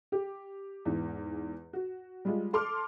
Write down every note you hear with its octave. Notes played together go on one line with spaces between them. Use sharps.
G4
E2 G#2 E3
F#4
G3 G#3 F4
A4 C6 D6 F6